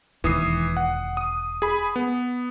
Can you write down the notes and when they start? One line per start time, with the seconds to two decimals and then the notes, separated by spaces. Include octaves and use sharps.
0.24 E1 D#2 E3 D#6 C7
0.77 F#5
1.17 D#6
1.62 G#4 B5
1.96 B3